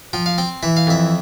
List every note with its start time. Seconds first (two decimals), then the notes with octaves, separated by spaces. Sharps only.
0.13 F3 G5
0.26 F5
0.38 C4 G5
0.63 E3 E5
0.77 F5
0.87 F2 E5